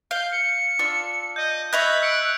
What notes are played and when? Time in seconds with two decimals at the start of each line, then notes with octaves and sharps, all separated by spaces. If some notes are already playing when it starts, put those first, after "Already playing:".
0.11 F5 G6
0.32 C#7
0.79 D4 F4 E6
1.36 D#5 G6
1.73 D#5 E5 B5 C#6 F#6 G#6 F7
2.02 E6 F#6 C#7 D7